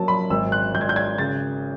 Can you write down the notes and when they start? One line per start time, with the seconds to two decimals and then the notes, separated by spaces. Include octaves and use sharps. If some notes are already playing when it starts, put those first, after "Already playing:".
Already playing: F#3 A#3 A5
0.08 B5
0.30 G#1 E6
0.52 F#6
0.74 G#1 G6
0.81 G#6
0.89 G6
0.96 G#6
1.18 C#3 A6